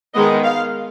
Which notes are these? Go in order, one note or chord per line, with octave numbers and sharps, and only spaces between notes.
D#3 G#3 B3 D#5
F5